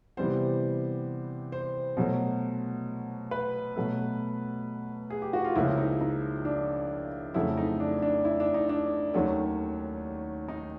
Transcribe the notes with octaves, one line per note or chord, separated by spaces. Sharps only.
C3 E3 G3 B3 C5
C5
B2 F#3 A3
B4
B2 F#3 A3
G#4
G4
F#4
F4
C#2 C#3 F3 A#3 C#4 E4
D#4
D#4
D4
F2 C#3 F#3 A3 E4
D#4
D4
D4
E4
D4
D#4
D4
D#2 D#3 F#3 A3 C#4
D#4